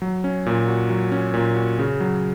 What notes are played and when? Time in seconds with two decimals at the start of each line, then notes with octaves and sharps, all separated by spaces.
0.02 F#3
0.24 C#4
0.46 A#2
0.68 F#4
0.90 F#3
1.12 C#4
1.34 A#2
1.56 F#4
1.79 C#3
2.00 F#3